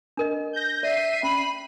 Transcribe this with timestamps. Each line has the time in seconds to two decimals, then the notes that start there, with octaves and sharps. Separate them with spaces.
0.17 D4 A#4 D#5
0.53 G6 A#6
0.83 D5 E5 C7 D#7
1.23 C#4 B5